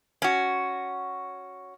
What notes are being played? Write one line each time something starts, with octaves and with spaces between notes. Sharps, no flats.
C#4 F#4